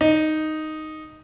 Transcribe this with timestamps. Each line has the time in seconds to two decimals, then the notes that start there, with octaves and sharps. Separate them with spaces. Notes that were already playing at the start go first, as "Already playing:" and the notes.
0.01 D#4